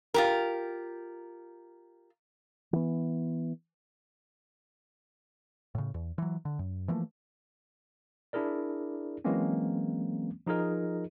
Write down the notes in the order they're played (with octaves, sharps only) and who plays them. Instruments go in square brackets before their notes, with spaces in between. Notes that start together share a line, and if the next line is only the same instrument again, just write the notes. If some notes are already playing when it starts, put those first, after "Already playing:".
[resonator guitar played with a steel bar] F4 G4 A#4
[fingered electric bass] E3 B3
[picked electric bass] A2 C#3
E2
E3 F#3
D3
F#2
E3 F3 A3 A#3
[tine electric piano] D4 E4 G#4 A#4 D5
E3 F#3 G#3 A#3 C4 C#4
F3 D#4 F4 G#4 A#4 D#5